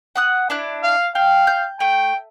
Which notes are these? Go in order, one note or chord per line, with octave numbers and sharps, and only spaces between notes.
F#5 D#6 F#6
D4 E4 F#6
F5
F5 G5
G6
A3 G5